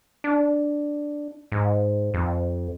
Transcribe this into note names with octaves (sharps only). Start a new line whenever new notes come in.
D4
G#2
F2